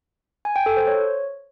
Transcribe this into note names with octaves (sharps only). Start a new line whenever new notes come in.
G#5
G5
A4
C5
C#5